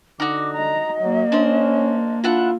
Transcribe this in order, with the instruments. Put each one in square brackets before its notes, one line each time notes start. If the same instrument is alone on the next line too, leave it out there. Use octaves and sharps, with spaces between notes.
[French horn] D3 [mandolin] D#4 F#4 [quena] D6
[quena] D#5 [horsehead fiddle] A#5
[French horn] F#3 [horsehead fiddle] A#3
[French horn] C#4 [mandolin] D4 C5
[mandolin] D4 E4 F#5 [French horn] F4